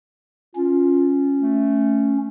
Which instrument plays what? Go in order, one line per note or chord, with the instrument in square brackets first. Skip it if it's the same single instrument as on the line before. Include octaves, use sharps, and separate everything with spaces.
[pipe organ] C#4 [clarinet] F4
[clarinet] A3